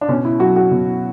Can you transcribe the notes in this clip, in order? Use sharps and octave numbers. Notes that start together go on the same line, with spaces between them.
D4
B2 C#4
E4
F#3 F#4
F#4
B2